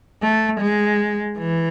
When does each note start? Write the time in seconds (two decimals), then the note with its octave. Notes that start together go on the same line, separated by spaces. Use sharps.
0.23 A3
0.61 G#3
1.38 E3